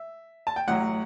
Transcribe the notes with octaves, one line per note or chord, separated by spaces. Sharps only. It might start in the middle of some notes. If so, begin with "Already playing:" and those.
Already playing: E5
A5
G5
A1 A2 F#3 F#5